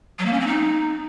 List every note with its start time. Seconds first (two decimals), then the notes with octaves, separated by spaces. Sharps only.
0.19 F#3
0.26 A#3
0.33 C#4
0.40 C4
0.47 D#4